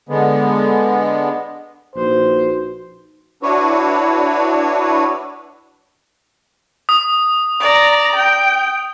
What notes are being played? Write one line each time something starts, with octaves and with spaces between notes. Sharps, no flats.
D3 G#3 B3
A#1 D#4 F#4 B4 C5
D4 E4 F#4 B4 C#5
D#6
D5 A#5
G5